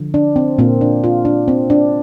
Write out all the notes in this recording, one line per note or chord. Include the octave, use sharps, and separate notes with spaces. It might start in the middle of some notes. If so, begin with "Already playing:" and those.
Already playing: D3 F3
D4
C4
A#2 A#3 C4
D4
F4
D4
C4
D4